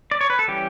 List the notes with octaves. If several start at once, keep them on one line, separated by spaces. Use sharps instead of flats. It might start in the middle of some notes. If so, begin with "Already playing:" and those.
D5
C#5
B4
A4
E3 G3 C#4 G4